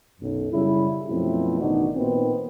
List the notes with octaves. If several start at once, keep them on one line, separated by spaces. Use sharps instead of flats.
B1 F#2
F#2 C#3 G3 E4
F#2 B2 F3 A3 C4 E4
A1 B2 D#3 D4 D#4 F#4
A#2 D#3 B3 C4